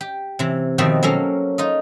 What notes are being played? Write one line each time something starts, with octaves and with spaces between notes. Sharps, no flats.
G4
C3 E3
B2 D#3 F3 C4 F#4 E5
F#3 A#3 C#4 A4 F5
D#4 F4 D#5